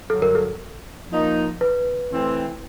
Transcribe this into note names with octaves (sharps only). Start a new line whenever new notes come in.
G2 D3 F#3 A4
A#4
A4
F3 A#3 D#4
B4
E3 A3 C4